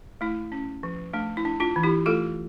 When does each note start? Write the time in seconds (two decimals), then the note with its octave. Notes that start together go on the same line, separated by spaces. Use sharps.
0.21 A3 E4
0.52 C#4
0.83 F3
1.13 A3 D4
1.37 E4
1.45 D4
1.60 D4 F4
1.76 E3
1.83 E4 G4
2.06 A3 F4 A4